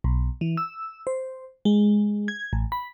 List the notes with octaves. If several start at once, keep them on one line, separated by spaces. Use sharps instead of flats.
B1
E3
E6
C5
G#3
G#6
A1
B5